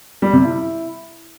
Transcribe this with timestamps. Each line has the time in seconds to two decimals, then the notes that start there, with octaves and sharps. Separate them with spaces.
0.22 G3
0.33 C3
0.44 E4